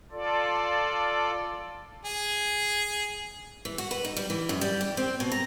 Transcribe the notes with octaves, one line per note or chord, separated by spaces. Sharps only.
F4 A4 D5
G#4
E3
F#4
B4
D#4
G3
E3
F#2
G3
G4
C4
B2
A#5